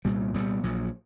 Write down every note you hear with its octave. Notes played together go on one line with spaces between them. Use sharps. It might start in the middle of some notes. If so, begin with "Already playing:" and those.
C2 A#2 G3 B3
C2 A#2 G3 B3
A#1 A#2 F#3